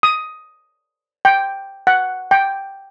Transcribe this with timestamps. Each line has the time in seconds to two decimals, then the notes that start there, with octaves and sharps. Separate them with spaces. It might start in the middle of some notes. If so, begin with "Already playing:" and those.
0.03 D#6
1.25 G5
1.87 F#5
2.31 G5